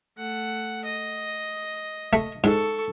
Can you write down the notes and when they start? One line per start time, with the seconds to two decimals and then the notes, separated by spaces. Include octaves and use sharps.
0.17 A3 F#5
0.85 D#5
2.13 A3
2.44 G#2 A4 C#6